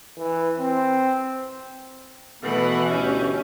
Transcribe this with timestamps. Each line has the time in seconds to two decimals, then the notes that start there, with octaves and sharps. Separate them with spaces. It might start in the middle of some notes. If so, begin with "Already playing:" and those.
0.18 E3
0.59 C4
2.43 B2 E3 A3 B3 F#5
2.89 D2 B2 C#4 G4 E5